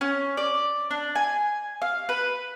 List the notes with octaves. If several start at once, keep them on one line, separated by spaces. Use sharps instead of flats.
C#4
D5
D4
G#5
F5
B4